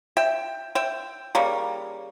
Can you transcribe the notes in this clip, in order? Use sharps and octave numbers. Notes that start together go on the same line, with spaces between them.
E5 G5
E5 G5
C#3 G3 A#3